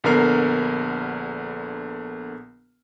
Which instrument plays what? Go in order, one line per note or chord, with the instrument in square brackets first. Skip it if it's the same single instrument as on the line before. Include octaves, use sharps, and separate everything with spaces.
[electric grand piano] A#1 D3 B3 A#4 F6 C7